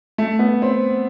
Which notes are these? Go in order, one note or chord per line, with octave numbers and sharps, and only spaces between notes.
A3
B3
C4